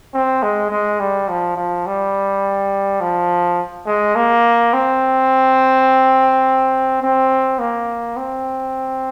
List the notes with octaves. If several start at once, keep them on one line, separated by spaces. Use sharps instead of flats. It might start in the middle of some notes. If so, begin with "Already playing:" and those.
C4
G#3
G#3
G3
F3
F3
G3
F3
G#3
A#3
C4
C4
A#3
C4